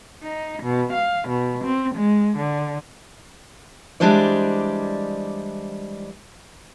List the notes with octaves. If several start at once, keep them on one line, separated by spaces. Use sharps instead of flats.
D#4
B2
F5
B2
C4
G#3
D3
E3 G3 G#3 D4 C5 D5